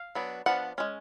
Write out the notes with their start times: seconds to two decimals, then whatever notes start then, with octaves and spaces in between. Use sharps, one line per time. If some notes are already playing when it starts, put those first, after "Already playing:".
Already playing: F5
0.15 F#3 B3 D4
0.46 F3 B3 D4 F#5
0.78 G#3 C#4